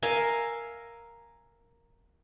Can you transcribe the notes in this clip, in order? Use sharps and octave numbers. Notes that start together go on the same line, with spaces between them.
A#4 E5 F5 G#5